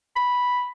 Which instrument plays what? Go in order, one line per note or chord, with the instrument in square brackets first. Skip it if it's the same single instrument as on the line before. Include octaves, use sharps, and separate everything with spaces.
[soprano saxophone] B5